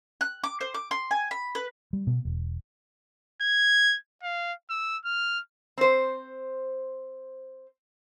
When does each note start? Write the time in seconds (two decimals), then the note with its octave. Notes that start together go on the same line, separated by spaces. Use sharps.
0.21 F#6
0.44 D6
0.61 C5
0.74 D6
0.91 C6
1.11 G#5
1.31 B5
1.55 B4
1.93 G3
2.07 B2
2.25 E1
3.42 G#6
4.23 F5
4.70 E6
5.05 F6
5.78 C4 C5